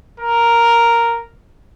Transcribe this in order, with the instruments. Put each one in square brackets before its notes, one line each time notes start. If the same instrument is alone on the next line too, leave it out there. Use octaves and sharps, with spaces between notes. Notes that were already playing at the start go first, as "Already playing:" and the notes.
[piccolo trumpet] A#4